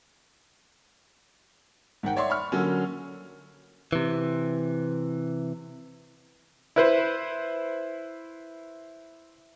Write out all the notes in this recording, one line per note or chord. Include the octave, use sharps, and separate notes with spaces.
G#2 D#3 F#5 G5
C#5 D5 E5 C6 C#6
B5 C#6 F6
D3 F#3 A#3 C#4
C3 E3
E4 B4 C5